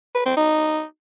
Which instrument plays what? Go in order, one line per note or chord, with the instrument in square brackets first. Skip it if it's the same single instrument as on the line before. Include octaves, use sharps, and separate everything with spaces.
[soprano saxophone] B4
C4
D#4